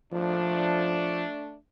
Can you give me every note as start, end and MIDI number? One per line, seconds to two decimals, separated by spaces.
0.13 1.25 53
0.13 1.55 57
0.13 1.55 62